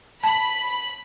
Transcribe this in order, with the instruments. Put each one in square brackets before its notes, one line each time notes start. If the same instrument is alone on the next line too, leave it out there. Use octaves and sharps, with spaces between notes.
[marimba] A5 [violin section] B5